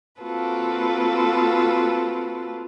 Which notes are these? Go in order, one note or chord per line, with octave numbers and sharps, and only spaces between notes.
A#3 C4 F4 F#4 A4 B4